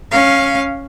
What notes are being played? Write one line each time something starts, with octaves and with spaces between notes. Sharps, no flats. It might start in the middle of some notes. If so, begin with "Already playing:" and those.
C#4 F5